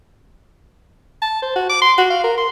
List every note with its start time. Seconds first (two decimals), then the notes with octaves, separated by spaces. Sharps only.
1.22 A5
1.42 C5
1.56 F#4
1.69 D6
1.82 C6
1.98 F#4
2.10 F5
2.24 A#4
2.38 C6